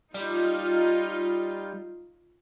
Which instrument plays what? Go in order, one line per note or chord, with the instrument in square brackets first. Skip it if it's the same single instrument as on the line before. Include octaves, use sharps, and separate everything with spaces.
[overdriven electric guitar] G3 [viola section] D#4 F4